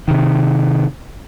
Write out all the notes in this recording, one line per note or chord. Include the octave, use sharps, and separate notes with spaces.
C3 D#3